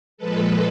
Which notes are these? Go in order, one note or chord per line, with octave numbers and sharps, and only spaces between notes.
A#2 F3 G#3 A4 B4